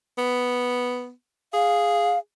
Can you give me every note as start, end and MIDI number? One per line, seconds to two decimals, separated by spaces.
0.18 1.11 59
1.53 2.17 68
1.53 2.19 77